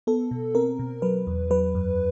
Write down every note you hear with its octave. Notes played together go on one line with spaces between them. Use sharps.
B3 A4
B2
C4 A#4
B2
F#3 B4
E2
F#3 B4
F#2